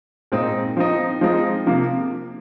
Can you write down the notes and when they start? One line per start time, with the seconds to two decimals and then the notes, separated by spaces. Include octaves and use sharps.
0.32 A#2 G#3 C4 D#4
0.77 F3 C4 D#4
1.21 F3 G#3 C4 D#4
1.67 C3 F3 A#3